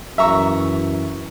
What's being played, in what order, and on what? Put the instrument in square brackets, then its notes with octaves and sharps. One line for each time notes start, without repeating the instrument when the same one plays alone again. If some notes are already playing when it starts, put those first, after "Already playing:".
[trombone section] F#2 E3 [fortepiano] E5 A#5 C#6